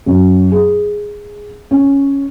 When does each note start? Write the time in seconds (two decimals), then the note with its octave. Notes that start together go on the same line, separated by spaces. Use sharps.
0.06 F#2
0.52 G#4
1.71 C#4